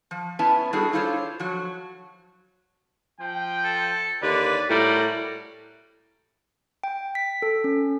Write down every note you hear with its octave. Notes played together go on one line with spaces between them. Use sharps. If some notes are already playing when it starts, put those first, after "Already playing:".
F3
B3 C#4 E4 A5
G3 D4 E4 F#4 G#4 A4
D4 E4 F4 A4 C5 C#5
F3 F#3
F3 G5
A4
D#2 D3 B4 D5
A2 G3 F#4 A#4
G5
B6
A4
C#4